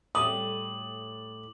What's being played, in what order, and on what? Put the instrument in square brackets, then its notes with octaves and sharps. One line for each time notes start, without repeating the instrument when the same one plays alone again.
[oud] A2 G3 F#4 [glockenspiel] D6 F#7 [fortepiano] D#6